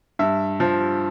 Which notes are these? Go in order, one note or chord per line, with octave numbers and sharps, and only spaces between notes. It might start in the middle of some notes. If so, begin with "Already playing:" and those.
G2 E5
F3